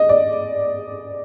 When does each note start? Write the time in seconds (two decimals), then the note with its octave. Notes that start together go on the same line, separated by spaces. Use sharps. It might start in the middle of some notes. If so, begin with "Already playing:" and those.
Already playing: D#5
0.09 D5